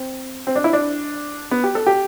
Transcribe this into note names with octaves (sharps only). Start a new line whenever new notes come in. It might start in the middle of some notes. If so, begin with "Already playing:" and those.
Already playing: C4
C4
D4
E4
D4
B3
G4
A4
G4